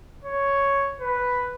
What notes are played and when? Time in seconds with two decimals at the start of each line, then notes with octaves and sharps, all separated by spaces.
0.25 C#5
1.01 B4